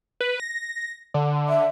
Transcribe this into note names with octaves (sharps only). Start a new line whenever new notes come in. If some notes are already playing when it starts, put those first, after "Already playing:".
B4
A#6
D3
E5